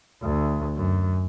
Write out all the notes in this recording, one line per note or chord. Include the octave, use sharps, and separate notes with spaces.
D2
F#2